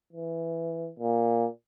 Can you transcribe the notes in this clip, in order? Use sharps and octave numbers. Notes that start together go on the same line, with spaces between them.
E3
A#2